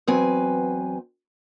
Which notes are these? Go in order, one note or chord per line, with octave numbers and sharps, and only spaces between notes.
E2 F#3 C4 B4 G#5